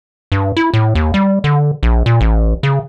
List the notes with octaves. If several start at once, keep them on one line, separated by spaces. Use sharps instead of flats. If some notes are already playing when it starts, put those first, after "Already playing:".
G2
E4
A2
D#2
G3
D3
A#1
A#2
A1
C#3